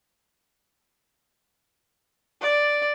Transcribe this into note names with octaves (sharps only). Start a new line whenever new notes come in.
D5